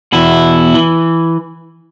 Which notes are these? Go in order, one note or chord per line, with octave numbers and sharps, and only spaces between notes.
E2 B2 E4
E3